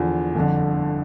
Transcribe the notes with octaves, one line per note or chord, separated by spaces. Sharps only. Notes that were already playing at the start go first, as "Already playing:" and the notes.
Already playing: E2 D3 F3
G1 F2 D3